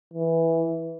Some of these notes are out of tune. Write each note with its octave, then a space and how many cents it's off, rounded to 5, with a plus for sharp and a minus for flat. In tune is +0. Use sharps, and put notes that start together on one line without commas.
E3 -5